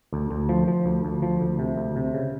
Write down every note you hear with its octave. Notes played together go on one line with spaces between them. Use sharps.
D2
D2
F3
F3
D2
D2
F3
D2
C3
D2
C3
C#3